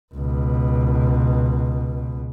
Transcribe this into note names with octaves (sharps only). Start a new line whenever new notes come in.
C#2 B2